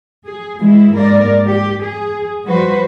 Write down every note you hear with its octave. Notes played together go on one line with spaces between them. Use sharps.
G#4
E3 G#3 E4
G#2 A#3 A#4 D5
G4
G#4
F3 G3 F#4 B4 C5